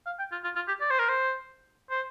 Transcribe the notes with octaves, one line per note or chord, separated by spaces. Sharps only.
F5
G5
F4
F4
F4
G4
D5
C5
A#4
C5
C5